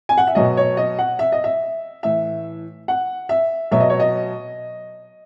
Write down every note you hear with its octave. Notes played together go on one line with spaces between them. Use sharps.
G#5
F#5
E5
B2 F#3 D#5
C#5
D#5
F#5
E5
D#5
E5
A2 E3 E5
F#5
E5
B2 F#3 E5
D#5
C#5
D#5